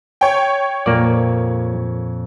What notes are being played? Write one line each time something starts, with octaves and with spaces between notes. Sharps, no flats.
C#5 G5
F2 A#2 A#3 D5